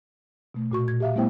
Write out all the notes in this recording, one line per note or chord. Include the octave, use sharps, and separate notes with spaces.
B2 A3
A#2 F#4 C#6
A#2 G#6
G4 E5 F5
G3 A3 B3 E4 C5 G5